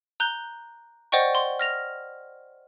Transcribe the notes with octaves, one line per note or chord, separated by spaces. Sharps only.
A#5 F#6 G6 G7
C5 D5 D#5 F#5 G5 C#6
C6
F6 A#6 F7